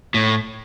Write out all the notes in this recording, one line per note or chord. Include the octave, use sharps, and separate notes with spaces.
A2